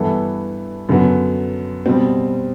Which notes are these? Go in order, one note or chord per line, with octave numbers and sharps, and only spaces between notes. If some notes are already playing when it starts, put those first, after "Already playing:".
Already playing: G2 E3 B3 E4 A4
F#2 D3 F#3 B3
B2 G3 C4